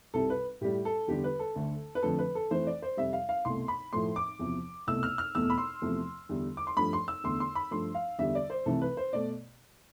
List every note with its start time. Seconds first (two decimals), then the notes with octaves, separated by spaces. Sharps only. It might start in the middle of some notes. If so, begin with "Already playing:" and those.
0.14 C2 C3 G3 A4
0.30 B4
0.61 A2 G3 G4
0.85 A4
1.08 E2 D3 G3 G4
1.24 B4
1.39 A4
1.56 D2 D3 A3
1.95 B4
2.02 F2 D3 F3 A3 A4
2.19 B4
2.35 A4
2.50 F2 E3 A3 C5
2.67 D5
2.82 C5
2.97 F2 C3 G3 E5
3.13 F5
3.29 F5
3.45 C2 B2 A3 C6
3.68 B5
3.93 A2 F3 A3 C6
4.16 D6
4.39 E2 C3 F3
4.87 C2 B2 A3 E6
5.03 F6
5.18 F6
5.35 E2 B2 A3 E6
5.50 B5
5.58 C6
5.82 E2 C3 F3 A3
6.29 E2 D3 G3
6.57 D6
6.67 C6
6.77 G2 F3 A3 B5
6.93 C6
7.08 E6
7.24 E2 D3 A3 C6
7.40 C6
7.55 B5
7.71 G2 F3 A3 C6
7.95 F5
8.19 E2 D3 G3 E5
8.35 D5
8.50 C5
8.66 C2 C3 E3 A3 A4
8.81 B4
8.97 C5
9.13 B2 A3 D5